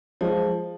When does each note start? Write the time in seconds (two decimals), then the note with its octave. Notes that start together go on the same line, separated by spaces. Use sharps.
0.21 F3 G#3